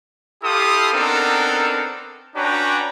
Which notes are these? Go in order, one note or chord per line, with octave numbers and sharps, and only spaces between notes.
E4 G4 A4 F5 C6 D#6
B3 C4 D4 D#4 A4 A#4
C#4 D4 F#4 B4 G5 A#5